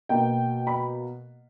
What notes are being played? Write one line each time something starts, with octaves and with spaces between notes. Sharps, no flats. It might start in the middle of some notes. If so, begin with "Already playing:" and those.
B2 A#3 G5
B5